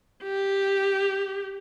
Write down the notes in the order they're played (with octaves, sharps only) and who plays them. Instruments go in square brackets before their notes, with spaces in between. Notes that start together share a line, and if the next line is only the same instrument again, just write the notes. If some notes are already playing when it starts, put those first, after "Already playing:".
[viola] G4